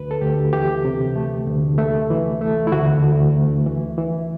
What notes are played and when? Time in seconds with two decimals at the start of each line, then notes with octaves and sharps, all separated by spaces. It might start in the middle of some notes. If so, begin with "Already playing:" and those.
Already playing: D2 B4
0.11 A4
0.21 D2 G4
0.53 E3 G4
0.85 C3
1.16 A3
1.47 D2
1.78 A3
2.10 E3
2.41 A3
2.67 E4
2.72 D2 F#4
3.03 D2
3.34 A3
3.66 E3
3.98 E3